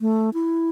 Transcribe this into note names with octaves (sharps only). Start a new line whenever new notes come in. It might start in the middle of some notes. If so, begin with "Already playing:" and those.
A3
E4